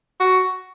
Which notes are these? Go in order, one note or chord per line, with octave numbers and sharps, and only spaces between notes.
F#4